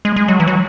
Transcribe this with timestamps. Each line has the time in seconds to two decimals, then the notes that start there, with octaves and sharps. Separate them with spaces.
0.05 G#3
0.16 G#3
0.28 F#3
0.40 E3
0.47 F#3